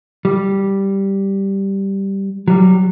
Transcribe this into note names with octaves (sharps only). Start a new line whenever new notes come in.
G3
F#3 G3